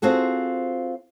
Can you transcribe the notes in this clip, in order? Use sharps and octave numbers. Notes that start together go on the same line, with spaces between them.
C4 F4 F#4 G#4 A4